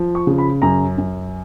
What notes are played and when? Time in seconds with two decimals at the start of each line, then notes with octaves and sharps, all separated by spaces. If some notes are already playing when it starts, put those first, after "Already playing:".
Already playing: F3
0.15 C#6
0.27 C#3
0.38 B5
0.62 F#2 A#5
0.98 F#2